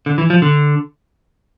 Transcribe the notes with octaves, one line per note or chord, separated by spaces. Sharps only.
D3
E3
F3
D3